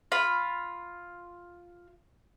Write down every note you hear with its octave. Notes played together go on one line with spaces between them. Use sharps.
F4 B5